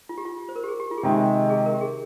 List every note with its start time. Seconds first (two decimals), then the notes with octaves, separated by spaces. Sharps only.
0.09 F4
0.18 G4
0.25 F4
0.49 C5
0.56 A#4
0.64 G4
0.68 G#4
0.80 G4
0.91 F4
0.98 G#4
1.03 C3 D#3 G#3 G4
1.50 G#4
1.66 A#4
1.74 G4
1.81 G#4